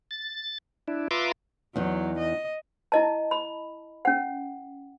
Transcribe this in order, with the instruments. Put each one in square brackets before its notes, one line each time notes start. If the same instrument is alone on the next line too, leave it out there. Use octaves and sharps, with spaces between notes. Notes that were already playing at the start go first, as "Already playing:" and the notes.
[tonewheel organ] A6
D4 E4
F4 B4 E5 A#5 C6 D6
[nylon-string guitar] E2 D#4 [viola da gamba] F#3
[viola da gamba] D#5
[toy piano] E4 D#5 A5
B5
C#4 F#5